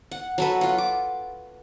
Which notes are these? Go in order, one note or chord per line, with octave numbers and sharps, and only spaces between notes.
F#5
F#3 A4 B4
F4 F#5
D6